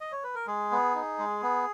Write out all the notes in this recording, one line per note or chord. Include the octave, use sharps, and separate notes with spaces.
D#5
C#5
B4
A#4
G#3 G#4
B3
D#4
G#3
B3